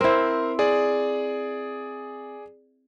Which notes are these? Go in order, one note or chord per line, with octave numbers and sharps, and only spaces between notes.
C4 E4 A#4 C5
G#4 D5